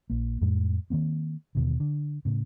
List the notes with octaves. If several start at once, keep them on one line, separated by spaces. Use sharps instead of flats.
A#1 A#3
F2 A2 G#3
D#3 F3 A#3 C4
D#2 B2 D3
D3
A2 C#3